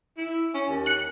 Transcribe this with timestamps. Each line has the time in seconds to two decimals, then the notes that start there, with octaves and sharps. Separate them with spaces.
0.17 E4
0.54 C#4
0.69 D#2
0.86 F#6 C#7